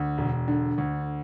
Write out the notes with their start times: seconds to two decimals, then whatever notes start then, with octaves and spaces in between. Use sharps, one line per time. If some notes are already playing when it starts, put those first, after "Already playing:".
Already playing: D2
0.18 E1
0.48 D3
0.78 D2